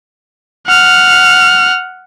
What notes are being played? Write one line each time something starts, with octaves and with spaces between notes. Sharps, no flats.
F#5 F6